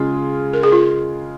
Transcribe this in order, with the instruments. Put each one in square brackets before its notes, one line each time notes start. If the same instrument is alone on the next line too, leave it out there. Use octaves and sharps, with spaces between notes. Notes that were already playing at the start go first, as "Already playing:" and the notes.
Already playing: [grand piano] C#3 G#3 F4 G#4
[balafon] A#4
G#4
F4